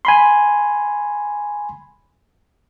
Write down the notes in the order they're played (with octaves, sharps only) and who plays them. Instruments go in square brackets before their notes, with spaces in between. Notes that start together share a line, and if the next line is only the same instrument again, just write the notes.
[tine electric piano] G#5 B5 C6